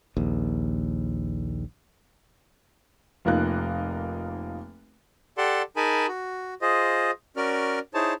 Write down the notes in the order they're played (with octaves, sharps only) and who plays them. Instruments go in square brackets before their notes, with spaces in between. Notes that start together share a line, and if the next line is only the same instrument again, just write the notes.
[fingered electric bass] A#1 D#2
[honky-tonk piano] F1 F3 A#3 D#4 F#6
[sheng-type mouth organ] G4 A4 D5 F#5 A5 C6
D#4 G#4 A#4 G#5 A5 B5
F#4
F4 G#4 C5 D#5
C#4 F#4 A#4 D5 F6
D#4 E4 G#4 C5 C#5 A5